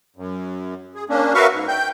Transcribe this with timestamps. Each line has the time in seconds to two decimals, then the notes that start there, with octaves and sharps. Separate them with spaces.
0.16 F#2
0.95 G#4
1.09 A#3 C#4 D4
1.34 F#4 A#4 B4 E5 F5 C#6
1.53 G#2
1.68 G5 G6